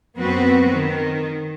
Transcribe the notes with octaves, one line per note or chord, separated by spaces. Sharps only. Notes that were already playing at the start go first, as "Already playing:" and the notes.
F#2 B3 C4 F#4 B4
D#3